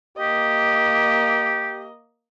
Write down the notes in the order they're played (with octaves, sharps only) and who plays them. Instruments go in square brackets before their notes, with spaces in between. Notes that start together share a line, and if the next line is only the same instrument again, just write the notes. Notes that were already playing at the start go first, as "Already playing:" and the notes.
[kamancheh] A#3 D#5 [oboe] G4